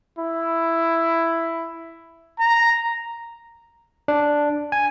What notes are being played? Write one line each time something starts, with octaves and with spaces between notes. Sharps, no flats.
E4
A#5
D4
G#5